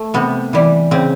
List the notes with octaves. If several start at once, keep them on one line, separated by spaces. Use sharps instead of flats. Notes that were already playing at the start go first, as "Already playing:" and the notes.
Already playing: A3
C3 B3
E3 G3
C#3 C4